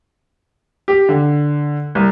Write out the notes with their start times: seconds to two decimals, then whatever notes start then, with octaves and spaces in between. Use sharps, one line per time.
0.88 G4
1.09 D3
1.95 C2